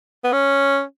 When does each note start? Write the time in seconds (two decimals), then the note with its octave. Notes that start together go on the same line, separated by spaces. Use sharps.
0.24 B3
0.33 C#4